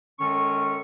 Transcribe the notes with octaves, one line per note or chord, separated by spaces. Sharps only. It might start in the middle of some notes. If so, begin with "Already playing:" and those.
F#2 D#3 G#3 C#4 A4 C#6